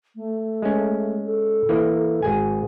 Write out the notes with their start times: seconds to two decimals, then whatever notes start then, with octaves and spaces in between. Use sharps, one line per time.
0.16 A3
0.62 G#3 C#4
1.25 A4
1.69 E3 A#3
2.22 G#1 G#4 G#5